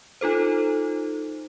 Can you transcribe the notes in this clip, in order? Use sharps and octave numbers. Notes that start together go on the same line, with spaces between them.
D#4 F4 A4 C5